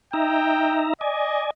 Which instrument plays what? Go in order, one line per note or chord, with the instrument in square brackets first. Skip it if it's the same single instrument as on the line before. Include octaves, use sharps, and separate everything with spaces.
[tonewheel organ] D#4 E5 A#5 [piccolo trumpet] G5
[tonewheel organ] D5 G#5 [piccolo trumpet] D#5